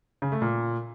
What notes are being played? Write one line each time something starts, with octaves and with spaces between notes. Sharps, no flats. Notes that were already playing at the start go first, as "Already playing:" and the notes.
C#3
A3
A#2